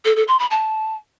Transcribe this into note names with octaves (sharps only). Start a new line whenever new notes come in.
A4
A4
C6
B5
A5